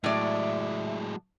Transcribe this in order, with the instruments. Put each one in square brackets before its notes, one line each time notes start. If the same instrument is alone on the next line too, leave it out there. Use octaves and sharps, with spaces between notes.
[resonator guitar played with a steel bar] A2 D5 [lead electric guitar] F#3 G#3 [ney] E5